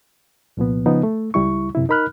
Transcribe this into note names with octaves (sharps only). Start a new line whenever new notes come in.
C2 A#2 F3 B3
C#3 F3 B3 D#4
A3
C#2 G3 E4 C#6
F#2 C3 E4
D#4 A#4 B5 F6 F#6